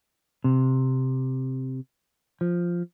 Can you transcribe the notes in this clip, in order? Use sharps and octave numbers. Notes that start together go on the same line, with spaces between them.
C3
F3